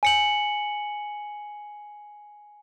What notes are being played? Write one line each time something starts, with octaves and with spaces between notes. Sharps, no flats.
G#5 C#7 F#7